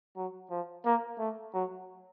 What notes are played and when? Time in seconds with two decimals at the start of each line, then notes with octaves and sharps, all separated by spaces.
0.17 F#3
0.50 F3
0.85 A#3
1.19 A3
1.54 F#3